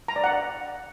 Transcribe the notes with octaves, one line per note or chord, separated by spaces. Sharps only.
A#5
D5
F#5